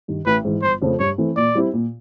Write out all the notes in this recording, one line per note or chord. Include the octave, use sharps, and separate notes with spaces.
G2 D#3
A1 B4
G#2 E3
G1 C5
F2 C#3 F3 A3
G2 C#5
E3 A3 C4
A#2 D5
G3 C4 E4
A#2